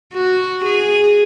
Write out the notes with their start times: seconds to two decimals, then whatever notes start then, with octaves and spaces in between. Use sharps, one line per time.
0.13 F#4
0.65 G#4